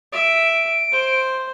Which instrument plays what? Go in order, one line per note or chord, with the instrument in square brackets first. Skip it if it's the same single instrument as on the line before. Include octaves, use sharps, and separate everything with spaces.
[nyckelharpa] E5 [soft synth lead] D7
[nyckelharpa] C5